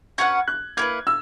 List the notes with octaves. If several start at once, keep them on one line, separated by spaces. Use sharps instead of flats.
C#4 F#4 B4 F#5 G#6
F#6
A#3 E4 B4 G#6
E6